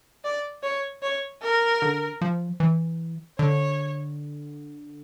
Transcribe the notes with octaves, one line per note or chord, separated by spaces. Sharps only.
D5
C#5
C#5
A#4
D3
F3
E3
D3 C#5